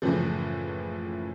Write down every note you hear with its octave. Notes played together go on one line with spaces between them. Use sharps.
F#1 A2 C#3 E3 F3